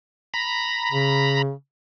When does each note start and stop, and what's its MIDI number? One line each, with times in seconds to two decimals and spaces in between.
0.34 1.42 82
0.34 1.42 83
0.92 1.52 49